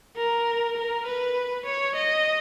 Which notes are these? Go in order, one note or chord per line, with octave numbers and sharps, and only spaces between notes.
A#4
A#4
B4
C#5
D#5